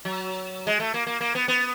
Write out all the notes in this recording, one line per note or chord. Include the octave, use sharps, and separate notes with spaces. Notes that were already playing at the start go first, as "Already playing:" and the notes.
F#3
G#3
A3
A#3
A#3
A#3
B3
B3